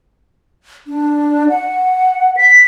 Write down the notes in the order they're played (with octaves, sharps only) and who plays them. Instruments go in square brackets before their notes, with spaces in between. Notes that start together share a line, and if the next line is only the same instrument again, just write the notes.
[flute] D4
F#5
B6